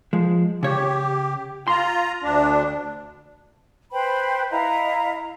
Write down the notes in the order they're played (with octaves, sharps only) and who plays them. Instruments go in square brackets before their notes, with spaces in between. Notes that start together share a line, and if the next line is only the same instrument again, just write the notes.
[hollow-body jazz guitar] F3 G#3
[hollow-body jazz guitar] C#3 C#5 [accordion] G4
[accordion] F4 A#5 [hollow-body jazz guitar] C6
[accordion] D2 D4
[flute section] B4 C5 G5 B5
E4 D#5 F5 A#5